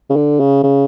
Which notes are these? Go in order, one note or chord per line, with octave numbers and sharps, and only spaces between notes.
C#3
D3
C#3
C#3